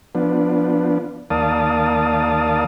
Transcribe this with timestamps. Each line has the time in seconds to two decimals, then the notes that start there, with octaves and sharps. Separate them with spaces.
0.15 F3 B3 D4
1.30 D#2 A#3 D5 F5 A5 D#6